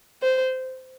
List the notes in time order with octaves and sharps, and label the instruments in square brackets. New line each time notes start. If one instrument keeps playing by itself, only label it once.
[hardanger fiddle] C5